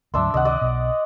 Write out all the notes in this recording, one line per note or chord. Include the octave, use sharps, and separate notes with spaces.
D2 G#2 F#3 D4 E5 C6
C#2 C3 D#3 D#5 F#5
D5 D#5
B1 B2